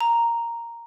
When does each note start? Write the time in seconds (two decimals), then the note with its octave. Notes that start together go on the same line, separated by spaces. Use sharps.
0.01 A#5